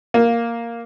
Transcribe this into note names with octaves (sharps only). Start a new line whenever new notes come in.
A#3